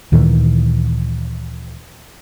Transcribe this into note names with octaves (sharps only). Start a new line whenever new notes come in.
D2 A#2 D#3 E3